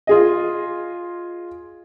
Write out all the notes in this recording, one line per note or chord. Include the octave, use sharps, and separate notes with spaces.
F4 G#4 D#5